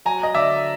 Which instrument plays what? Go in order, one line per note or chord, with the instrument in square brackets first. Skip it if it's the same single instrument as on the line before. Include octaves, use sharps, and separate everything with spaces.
[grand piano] F#3 G#5 A#5
D#5
D3 D5 E5